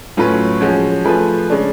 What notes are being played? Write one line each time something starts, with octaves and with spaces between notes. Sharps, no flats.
A2 F#3 C#4 F4 B4
F3 G#3 C#4 F#4
F3 A3 F4 G#4 B4
C#3 G#3 D4